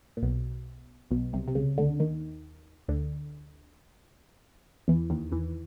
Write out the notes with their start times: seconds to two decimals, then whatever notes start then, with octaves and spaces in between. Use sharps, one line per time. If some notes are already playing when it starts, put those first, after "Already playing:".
0.17 A#2
0.22 B1 B2
1.11 B1 B2
1.33 C2 C3
1.48 C3
1.55 C#2 C#3
1.78 D2 D3
2.00 D#2 D#3
2.88 D2 D3
4.88 E2 E3
5.10 D#2 D#3
5.32 E2 E3